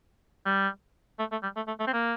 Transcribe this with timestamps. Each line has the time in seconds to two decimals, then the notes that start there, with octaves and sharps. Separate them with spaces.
0.46 G3
1.19 A3
1.32 A3
1.43 G3
1.56 A3
1.67 A3
1.80 A3
1.87 C4
1.93 A#3